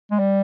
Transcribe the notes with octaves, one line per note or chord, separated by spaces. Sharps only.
G#3
G3